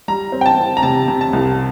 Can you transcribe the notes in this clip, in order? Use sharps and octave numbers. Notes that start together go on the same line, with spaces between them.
G3 A#5
C4
G5
A5
C4
A#5
C3 A5
C3
A5
C2